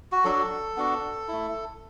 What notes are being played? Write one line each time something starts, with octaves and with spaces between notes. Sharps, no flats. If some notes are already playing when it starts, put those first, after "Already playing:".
F#4
F#3 D4 F#4 A4
B3 D4 F#4
A3 E4